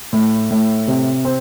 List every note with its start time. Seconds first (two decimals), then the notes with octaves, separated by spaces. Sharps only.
0.13 A2
0.51 A2
0.87 C3
1.25 C4